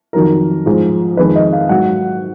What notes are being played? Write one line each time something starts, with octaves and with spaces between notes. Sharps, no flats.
F2 D#3 F#3 A#4
G#2 F3 G#3
F2 D#3 G#3 B4
D#5
F5
G#2 F#3 F#5